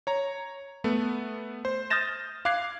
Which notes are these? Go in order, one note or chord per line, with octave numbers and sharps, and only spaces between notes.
C#5 A#5
A3 B3
C5
D#6 F6 G6 A6 A#6 E7
F5 D6 F#6 G#6 C7